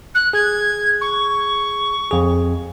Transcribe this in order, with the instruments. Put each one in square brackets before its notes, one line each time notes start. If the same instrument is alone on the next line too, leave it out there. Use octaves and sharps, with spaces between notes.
[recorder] F#6
[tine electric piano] G#4 [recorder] G#6
[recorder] C#6
[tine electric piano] F2 G#4